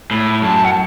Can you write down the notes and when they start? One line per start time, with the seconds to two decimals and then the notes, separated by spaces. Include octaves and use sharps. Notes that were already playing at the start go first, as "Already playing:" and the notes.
0.11 A2 B5
0.42 F#2 A5
0.65 F#5
0.71 A5